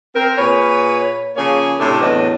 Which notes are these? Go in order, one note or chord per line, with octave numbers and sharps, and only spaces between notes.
C4 A#4
A#2 G#4 B4 C#5
C#3 F3 A#3 G#4 C#5
A2 C3 D4 E4 A4
E2 A2 F#3 D4 B4 D#5